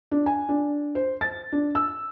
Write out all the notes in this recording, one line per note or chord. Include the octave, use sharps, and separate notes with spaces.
D4
G#5
D4
C5
A6
D4
E6